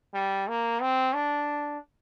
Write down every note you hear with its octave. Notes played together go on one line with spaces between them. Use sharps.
G3
A#3
C4
D4